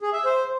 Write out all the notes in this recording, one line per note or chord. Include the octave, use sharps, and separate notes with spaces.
G#4
E5
C5